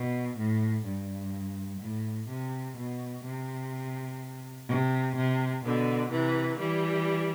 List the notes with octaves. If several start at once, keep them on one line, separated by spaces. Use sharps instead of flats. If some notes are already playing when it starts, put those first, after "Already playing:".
Already playing: B2
A2
G2
A2
C3
B2
C3
C3
C3
B2 D3
C3 E3
E3 G3